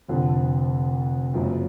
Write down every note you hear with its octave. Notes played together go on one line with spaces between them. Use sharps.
F1 F2 D3 F3
F#1 F#2 F3 G#3